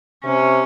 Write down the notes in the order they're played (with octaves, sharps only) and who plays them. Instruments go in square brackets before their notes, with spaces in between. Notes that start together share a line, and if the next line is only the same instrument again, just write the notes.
[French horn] C3 [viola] C#4